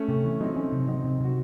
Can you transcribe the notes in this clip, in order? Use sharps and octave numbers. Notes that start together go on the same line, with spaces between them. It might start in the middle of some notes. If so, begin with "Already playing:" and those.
Already playing: A3 C#4
C3
E3
F#3 C4 D#4
C#4
C3
F#3 C4 D#4
C3
C3 F#4